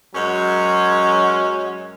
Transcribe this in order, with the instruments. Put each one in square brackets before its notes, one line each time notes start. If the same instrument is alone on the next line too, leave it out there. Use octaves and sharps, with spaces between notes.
[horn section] F#2 F#3 G#3 C#4